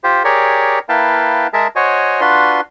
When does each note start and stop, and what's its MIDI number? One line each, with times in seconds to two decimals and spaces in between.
0.04 0.23 65
0.04 0.23 67
0.04 0.23 72
0.24 0.79 67
0.24 0.79 68
0.24 0.79 70
0.24 0.79 73
0.24 0.79 74
0.89 1.47 58
0.89 1.47 64
0.89 1.47 71
0.89 1.47 77
0.89 1.47 79
0.89 1.47 81
1.53 1.67 56
1.53 1.67 68
1.53 1.67 70
1.53 1.67 76
1.53 1.67 81
1.76 2.21 66
1.76 2.21 72
1.76 2.21 73
1.76 2.21 75
1.76 2.21 80
2.21 2.61 62
2.21 2.61 65
2.21 2.61 66
2.21 2.61 71
2.21 2.61 84